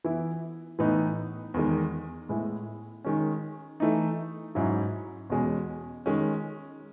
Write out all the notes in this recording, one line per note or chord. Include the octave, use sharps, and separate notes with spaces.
E3 B3 E4
A2 E3 B3 D#4
E2 D#3 G#3
A2 G#3 B3 E4
D#3 G#3 C#4
E3 A3 D#4
G#2 F#3 C#4 E4
E2 B2 G#3 C#4
D#3 G#3 C#4